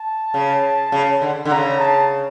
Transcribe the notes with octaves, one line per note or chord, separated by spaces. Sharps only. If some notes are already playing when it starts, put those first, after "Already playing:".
Already playing: A5
C#3
C#3
D3
D3
C#3 A#5
A5